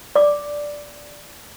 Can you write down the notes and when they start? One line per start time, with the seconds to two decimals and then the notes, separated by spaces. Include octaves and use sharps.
0.16 D5 D6